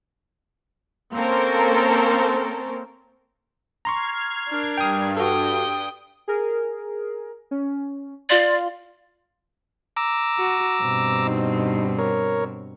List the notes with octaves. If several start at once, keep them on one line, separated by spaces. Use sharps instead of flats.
A#3 C4 C#4 A4 A#4 C5
A#5 C6 C#6 F6 G#6 C7
D4 A#4
G2 G5 D#6
F#4 A4 G5 D#6
G#4 A#4
C#4
F4 D5 F5 C6
A#5 D6 E6
F#4
G2 B2 C4
D#4
A#4 C#5